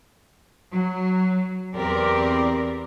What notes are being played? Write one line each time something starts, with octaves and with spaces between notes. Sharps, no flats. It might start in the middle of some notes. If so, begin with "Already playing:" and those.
F#3
E2 C4 G4 A#4 D5